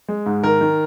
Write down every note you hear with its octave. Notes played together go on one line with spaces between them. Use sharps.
G#3
G#2
D#3 A#4
D#3